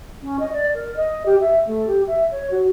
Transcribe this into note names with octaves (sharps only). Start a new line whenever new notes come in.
C#4
D#5
D5
A#4
D#5
G4
E5
A3
G4
E5
C#5
F#4